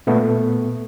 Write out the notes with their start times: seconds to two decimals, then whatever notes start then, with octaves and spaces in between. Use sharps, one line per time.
0.07 A#2 A3 B3